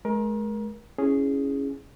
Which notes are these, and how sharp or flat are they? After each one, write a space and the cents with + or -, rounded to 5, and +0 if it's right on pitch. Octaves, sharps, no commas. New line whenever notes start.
G#3 +40 A#4 +25
C#4 +0 E4 -10 G#4 +0